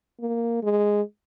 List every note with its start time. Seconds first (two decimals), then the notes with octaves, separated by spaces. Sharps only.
0.20 A#3
0.63 G#3